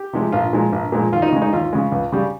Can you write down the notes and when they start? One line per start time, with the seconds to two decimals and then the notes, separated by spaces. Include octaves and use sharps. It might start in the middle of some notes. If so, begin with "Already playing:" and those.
Already playing: G4
0.13 C3 F3 G#3
0.32 A#1 F4
0.53 A#2 F3 G#3
0.72 A#1
0.92 A#2 F3 G#3
1.12 D#2 F4
1.22 D#4
1.33 C#3 G#3
1.42 D#4
1.53 D#2 F4
1.73 C#3 G#3
1.92 C#2
2.12 C#3 G3